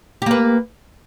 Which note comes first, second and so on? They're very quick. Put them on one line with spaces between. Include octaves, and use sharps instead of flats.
G4 A#3 B4